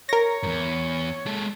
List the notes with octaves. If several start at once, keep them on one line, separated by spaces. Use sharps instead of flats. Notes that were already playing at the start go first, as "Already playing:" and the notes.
A#4 C#5 A#6
E2 G2
G#3 A4